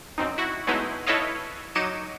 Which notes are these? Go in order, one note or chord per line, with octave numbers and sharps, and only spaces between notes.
F#2 C4 D#4
E4 F#4
F#3 G#3 A3 B3 D#4 E4
E4 A4 B4 C#5 D#5 F5
F#3 D#4 D6 C#7 D#7 E7